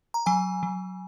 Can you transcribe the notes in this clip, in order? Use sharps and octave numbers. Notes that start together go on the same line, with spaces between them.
A#5
F#3 G#5
F#3